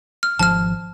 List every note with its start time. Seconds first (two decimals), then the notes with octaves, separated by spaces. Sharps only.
0.23 F6
0.39 G#1 F3 A5 F6